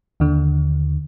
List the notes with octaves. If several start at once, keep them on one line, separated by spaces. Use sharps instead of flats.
D#2 D3